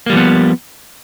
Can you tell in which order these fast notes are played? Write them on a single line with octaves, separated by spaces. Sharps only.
A#3 G3 F3 B3